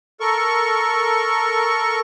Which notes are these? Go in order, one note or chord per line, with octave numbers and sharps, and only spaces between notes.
A4 A#4 C#6